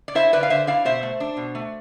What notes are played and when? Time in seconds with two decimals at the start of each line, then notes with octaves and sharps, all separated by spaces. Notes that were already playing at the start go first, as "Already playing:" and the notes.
0.08 D5
0.15 E4 C5 E5
0.32 D3 B4 D5
0.43 F5
0.50 D3 C5 E5
0.67 E4 D5 F5
0.85 B2 C5 E5
1.03 A3
1.20 D4
1.37 B2
1.55 A3